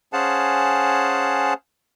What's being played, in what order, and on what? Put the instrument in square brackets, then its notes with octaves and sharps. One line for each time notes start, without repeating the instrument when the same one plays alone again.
[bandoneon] C#4 G#4 C5 F5 F#5 A5